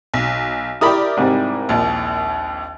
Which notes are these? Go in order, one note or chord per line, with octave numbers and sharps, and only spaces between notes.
B1
E4 G4 A#4 D5 B5 D#6
G#2 C3 G3
A#1 D#2